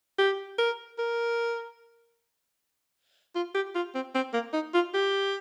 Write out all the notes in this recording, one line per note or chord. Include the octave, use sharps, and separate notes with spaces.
G4
A#4
A#4
F4
G4
F4
C4
C4
A#3
D#4
F4
G4